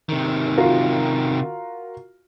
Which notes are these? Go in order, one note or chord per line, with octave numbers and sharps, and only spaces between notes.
C3 D#3
F4 F#4 A#4